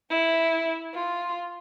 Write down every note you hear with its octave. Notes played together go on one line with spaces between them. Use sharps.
E4
F4